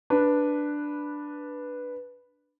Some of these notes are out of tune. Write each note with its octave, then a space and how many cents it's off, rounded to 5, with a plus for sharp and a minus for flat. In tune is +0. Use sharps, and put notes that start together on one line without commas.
D4 +0 B4 -5